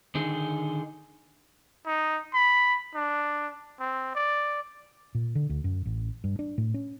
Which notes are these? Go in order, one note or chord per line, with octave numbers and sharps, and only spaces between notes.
D3 D#3 D#4 G#4
D#4
B5
D4
C4
D5
A#2
D3
D2
F#2
A1
G2
D4
A2
C#4